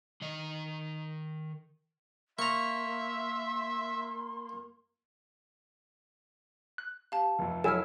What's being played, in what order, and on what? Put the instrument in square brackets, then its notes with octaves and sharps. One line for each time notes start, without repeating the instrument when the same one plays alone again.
[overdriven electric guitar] D#3 D#5
[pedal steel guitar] A#3 [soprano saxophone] E5 [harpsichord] A#5 C#6 [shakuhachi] C6
[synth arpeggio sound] F#6
[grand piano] G4 [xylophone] F5 A5
[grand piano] F1 F2
[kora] F#3 E4 [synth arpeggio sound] A4 G#5 [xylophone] F6 E7